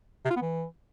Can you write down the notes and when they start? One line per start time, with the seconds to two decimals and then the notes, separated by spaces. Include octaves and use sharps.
0.25 C3
0.30 F4
0.36 B3
0.42 E3